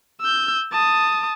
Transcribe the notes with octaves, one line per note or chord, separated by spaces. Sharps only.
E6 G6
A5 D#6